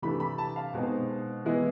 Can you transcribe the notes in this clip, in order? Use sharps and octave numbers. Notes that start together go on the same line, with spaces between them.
C3 E3 A3 D4 B5
B5
A5
F5
B2 G#3 C4 D#4
E3 G#3 B3 E4